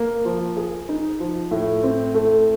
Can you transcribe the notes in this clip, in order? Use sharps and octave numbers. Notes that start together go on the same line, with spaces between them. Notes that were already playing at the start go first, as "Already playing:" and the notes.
Already playing: A#3
F3
G#4
D#4
F3
A2
C4
A3